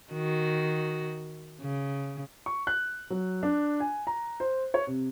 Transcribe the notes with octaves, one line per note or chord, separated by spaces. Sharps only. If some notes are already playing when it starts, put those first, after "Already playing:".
D#3 F#4
C#3
C#6
F#6
F#3
D4
G#5
A#5
C5
C#5
C3